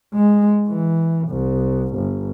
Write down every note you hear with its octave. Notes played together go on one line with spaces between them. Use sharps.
G#3
E3
C2
G1